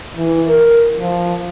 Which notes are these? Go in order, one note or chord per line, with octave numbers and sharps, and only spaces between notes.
E3
A#4
F3